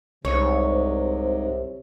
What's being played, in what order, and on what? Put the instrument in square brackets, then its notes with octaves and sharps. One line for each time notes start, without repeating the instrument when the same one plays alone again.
[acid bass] C2 [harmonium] G#2 [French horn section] C3 [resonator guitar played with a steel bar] C#5